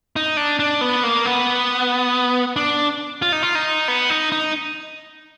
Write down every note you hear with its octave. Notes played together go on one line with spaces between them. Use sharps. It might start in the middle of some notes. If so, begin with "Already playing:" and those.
D#4
D4
D4
B3
A#3
B3
D4
F4
D#4
F4
D#4
B3
D#4
D#4